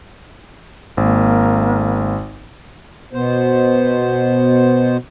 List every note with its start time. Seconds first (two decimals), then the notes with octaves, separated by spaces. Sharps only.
0.97 G#1 A#3
3.13 B2 B3 C5